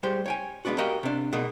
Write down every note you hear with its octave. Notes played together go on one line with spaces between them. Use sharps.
G3 G#3 G4 C5
C#5 G5 G#5
G#3 A#3 B3 D4 F#4
F#4 G4 A#4 D#5 F5 G5
C3 D4
B2 G#3 D#4 A#4